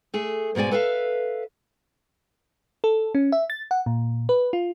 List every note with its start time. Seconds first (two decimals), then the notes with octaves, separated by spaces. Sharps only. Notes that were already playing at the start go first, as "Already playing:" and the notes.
0.14 A3 G#4
0.55 G#2 B2 G#3 D5 G#5
0.71 A4 B4 E5 F5
2.84 A4
3.15 C#4
3.32 E5
3.50 A6
3.71 F#5
3.86 A#2
4.29 B4
4.53 F4